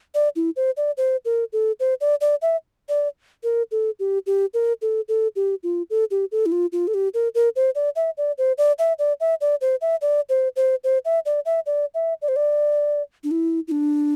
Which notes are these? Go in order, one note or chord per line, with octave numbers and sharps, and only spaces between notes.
D5
E4
C5
D5
C5
A#4
A4
C5
D5
D5
E5
D5
A#4
A4
G4
G4
A#4
A4
A4
G4
F4
A4
G4
A4
E4
F4
F4
A4
G4
A#4
A#4
C5
D5
E5
D5
C5
D5
E5
D5
E5
D5
C5
E5
D5
C5
C5
C5
E5
D5
E5
D5
E5
D5
C5
D5
D4
E4
E4
D4